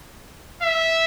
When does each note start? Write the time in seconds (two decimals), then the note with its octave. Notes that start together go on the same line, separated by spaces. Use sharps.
0.62 E5